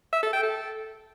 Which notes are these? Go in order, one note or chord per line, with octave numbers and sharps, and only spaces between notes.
E5
A4
G5
A4